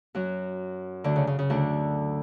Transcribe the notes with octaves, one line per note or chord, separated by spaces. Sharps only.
F#2 F#3
D2 D3
C#3
C#3
C#3
D2 D3